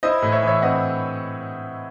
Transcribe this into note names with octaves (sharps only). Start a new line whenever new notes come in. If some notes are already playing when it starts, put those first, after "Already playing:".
E4 C5 D#5
A2
C#5 E5
E3
C#5 E5
C4 D#5 F#5